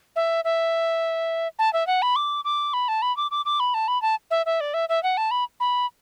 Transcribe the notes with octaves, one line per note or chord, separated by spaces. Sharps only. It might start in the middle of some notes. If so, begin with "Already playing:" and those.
E5
E5
A5
E5
F#5
B5
D6
D6
B5
A5
B5
D6
D6
D6
B5
A5
B5
A5
E5
E5
D5
E5
E5
F#5
A5
B5
B5